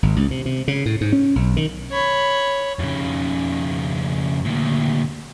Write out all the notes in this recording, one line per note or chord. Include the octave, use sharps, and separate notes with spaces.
G#1
C#2
C3
C3
C#3
A2
G#2
C#4
B1
D#3
C#5 B5
F2 C#3
D2 A#2